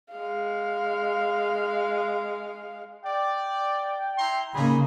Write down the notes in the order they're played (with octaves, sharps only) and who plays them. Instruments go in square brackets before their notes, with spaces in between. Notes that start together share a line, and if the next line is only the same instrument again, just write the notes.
[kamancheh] G#3 F5
[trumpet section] D5 [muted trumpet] G5
[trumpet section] E4 A#5 C6
[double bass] C#3 A#3 [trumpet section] D#4 G#4 [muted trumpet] B5